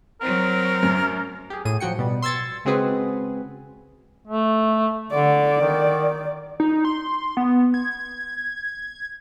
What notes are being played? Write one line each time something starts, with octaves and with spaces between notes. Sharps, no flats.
F#3 C4 A#4
F#2
G4 G#4
A2 G#4 D#7
F3 F#3 F#4 G5 C#7
B2 G3
C6 E6 G#6 A6 C#7
C#3 G#3 C4 F#4 G#4 B4
A3
D3 D5
D#3
D#4
C6
B3
G#6